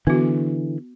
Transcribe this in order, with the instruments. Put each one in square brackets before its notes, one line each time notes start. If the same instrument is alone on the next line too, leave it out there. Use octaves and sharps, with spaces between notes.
[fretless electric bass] D3 E3 [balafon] B3 F#4